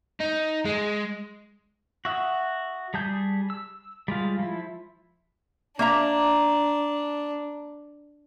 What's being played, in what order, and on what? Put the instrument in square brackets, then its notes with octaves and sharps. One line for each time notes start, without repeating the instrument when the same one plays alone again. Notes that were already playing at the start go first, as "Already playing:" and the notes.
[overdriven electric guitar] D#4
G#3
[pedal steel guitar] F#4 E5 F#5 D#6
G3 G#4 A5 G6
E6
G3 G#3 F4
F3 E4
[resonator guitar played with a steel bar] A#3 E5 A#5 [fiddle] D4